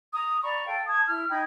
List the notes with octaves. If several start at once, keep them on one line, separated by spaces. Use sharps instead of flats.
A#5 D#6
D5 A#5 B5 C#6
A4 F5 G5
A5 D#6 G#6
E4 F6
D#4 G5 B5 G#6